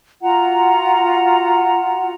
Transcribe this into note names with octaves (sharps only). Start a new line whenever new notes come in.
F4 F#4 F#5 A#5